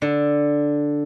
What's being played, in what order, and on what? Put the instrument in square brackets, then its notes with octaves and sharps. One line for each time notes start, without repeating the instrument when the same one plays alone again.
[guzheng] D3